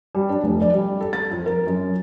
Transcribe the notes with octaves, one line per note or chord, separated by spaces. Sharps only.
G3
D4
F1
D5
G3
A4
A6
F2
A#4
F#2